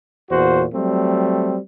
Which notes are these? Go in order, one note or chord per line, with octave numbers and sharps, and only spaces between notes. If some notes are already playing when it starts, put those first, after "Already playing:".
E2 A#2 F#4 C5
F#3 G3 A3 C4